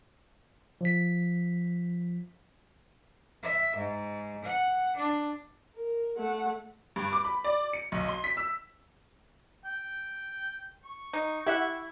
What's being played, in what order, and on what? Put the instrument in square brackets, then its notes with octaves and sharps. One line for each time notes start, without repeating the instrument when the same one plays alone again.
[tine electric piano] F3 B6
[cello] E5
G#2
F#5
D4
[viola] A#4
A3 F#5
[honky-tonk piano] G2
D6
B5
D5
C#7
B1
C6
B6
E6
[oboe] G5
C#6
[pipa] D#4
[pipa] E4 [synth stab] G4 E5 F#5